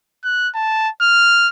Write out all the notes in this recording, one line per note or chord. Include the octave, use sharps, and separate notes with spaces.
F#6
A5
F6